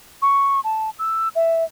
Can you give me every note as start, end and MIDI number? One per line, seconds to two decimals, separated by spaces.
0.22 0.60 85
0.64 0.90 81
0.99 1.29 88
1.35 1.64 76